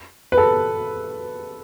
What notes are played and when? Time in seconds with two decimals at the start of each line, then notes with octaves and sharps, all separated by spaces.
0.32 B4
0.37 A4